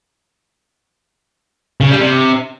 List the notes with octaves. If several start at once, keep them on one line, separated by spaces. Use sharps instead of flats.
C#3
G3
C3